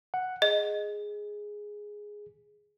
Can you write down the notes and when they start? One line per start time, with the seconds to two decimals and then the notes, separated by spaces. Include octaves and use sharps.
0.14 F#5
0.42 G#4 D#5